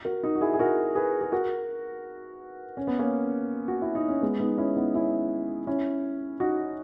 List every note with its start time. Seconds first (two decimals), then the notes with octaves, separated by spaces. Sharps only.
0.05 F#4 A#4
0.23 D#4 F#4
0.35 F#4
0.41 E4 G#4
0.53 G#4
0.59 F#4 A#4
0.95 G#4 B4
1.21 G#4
1.32 F#4 A#4
2.77 C#4
2.87 B3
2.99 A#3 C#4
3.68 F#4
3.82 E4
3.95 D#4
4.09 C#4
4.22 G#3 B3
4.40 B3 D#4
4.58 C#4 E4
4.76 B3 D#4
4.94 C#4 E4
5.67 C#4 E4
6.40 D#4 F#4